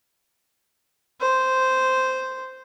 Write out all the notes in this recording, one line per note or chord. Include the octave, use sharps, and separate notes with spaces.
C5